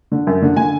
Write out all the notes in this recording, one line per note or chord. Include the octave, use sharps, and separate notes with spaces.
D3
F#2
D3
D3 G#5